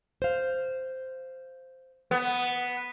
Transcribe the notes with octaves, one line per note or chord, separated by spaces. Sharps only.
C5 F5
B3